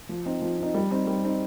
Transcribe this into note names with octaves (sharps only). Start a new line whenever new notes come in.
F3
C4 D#4
F3
C4 D#4
G3
C4 D#4
G3
C4 D#4